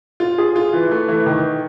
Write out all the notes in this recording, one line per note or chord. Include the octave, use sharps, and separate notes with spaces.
F4
G#4
F4
E3
A3
E3
D#3